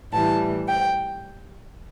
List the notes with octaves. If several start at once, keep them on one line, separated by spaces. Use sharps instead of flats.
A2 E3 G3 A5
G5